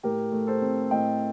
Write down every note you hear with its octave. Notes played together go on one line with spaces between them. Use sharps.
A2 G4 A#4
A3
A4 C5
C4
A2 D#5 G5